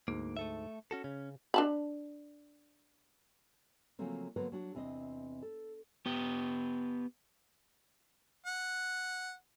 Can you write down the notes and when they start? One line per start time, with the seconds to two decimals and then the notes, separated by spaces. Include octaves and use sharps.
0.08 D2 G#2 A#3
0.37 A3 A4 E5
0.91 C#4 F#4 A4
1.04 C#3 C#4
1.54 D4 A5 B5
3.99 C#3 F3 F#3 A3 A#3 C4
4.36 D3 F#3 A#3 B3 B4 C5
4.52 F#3 D4 F#4
4.75 E2 C3 C4 D4 D#5
5.42 A4
6.06 B3 G4
8.47 F#5